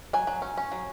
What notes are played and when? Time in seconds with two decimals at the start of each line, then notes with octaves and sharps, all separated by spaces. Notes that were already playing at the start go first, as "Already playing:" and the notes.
0.13 F#3 G#5
0.27 F#3
0.42 C#4
0.57 C#4
0.72 F#3